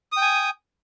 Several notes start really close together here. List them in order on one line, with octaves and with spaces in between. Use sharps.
D#6 G5 G#5